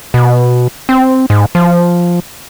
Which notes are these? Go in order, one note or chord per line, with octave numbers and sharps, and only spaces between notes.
B2
C4
G#2
F3